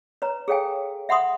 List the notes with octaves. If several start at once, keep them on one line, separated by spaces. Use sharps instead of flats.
B4 C#5 A#5
G#4 A4 C#5 F5 G5 G#5
E5 F#5 B5 C6 D#6